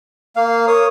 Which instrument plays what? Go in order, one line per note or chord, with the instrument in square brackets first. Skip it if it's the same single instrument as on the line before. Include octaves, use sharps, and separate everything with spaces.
[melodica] A#3 F5
[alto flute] A#4 [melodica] C#5 D#6